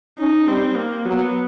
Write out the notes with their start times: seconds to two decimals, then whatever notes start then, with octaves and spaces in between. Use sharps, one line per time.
0.19 C#4 D#4
0.47 G3 C4
0.76 A#3
1.05 F#3 B3